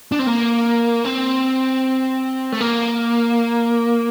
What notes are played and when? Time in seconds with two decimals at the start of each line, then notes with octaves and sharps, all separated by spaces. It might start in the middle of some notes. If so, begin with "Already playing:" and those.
0.12 D4
0.19 C4
0.27 A#3
1.05 C4
2.52 A3
2.61 A#3